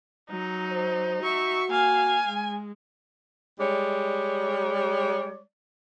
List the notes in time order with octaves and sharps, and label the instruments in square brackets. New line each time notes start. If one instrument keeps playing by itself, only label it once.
[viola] F#3 [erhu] D#4
[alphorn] C5
[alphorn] F#4 [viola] E5 C#6
[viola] A#3 F5 [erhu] G#5
[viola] G#3
[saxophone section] G3 G#3 C#5 D5